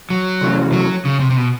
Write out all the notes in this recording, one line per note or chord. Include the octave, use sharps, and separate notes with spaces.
F#3
C3 E3 A3 C#4 F#4
F#3
C#3
C3
C3
B2